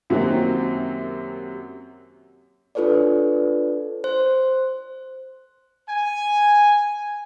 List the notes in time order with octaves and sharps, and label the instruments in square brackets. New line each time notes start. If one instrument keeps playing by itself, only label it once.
[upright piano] F#2 C3 D#3 F#3 A#3 C4
[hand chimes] D4 F4 A4 B4 C#5 D5
C5
[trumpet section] G#5